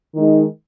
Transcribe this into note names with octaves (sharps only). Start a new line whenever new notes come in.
D#3 G#3 D#4